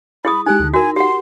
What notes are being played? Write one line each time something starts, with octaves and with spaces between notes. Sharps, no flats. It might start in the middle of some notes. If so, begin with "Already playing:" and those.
E4 G#4 B5 D#6
G#3 D#4 G4 G#5 F#6
D2 D3
D#4 F#4 A#4 G#5
G4 F#5 C6